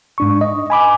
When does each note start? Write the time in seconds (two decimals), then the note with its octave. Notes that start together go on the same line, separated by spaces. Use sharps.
0.18 G#2 D4 C#6
0.41 D#5
0.70 G#5 B5 D6